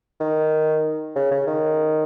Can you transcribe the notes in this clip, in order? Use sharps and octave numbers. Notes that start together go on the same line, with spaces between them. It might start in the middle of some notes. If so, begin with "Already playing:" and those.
D#3
C#3
C#3
D#3